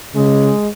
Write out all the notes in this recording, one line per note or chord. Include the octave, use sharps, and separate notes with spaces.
C#3 G#3